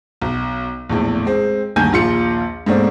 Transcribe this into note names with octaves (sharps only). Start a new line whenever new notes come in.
B1
A#1 E2 A2
G#3 C4
D2 G2 D#3 A#3 G#5 G6
A#1 D#2 F4 C6 C#7
G#2 B2 A3 A#3 C4 D4